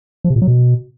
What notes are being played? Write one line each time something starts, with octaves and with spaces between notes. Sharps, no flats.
F3
C3
A#2
F#3
B2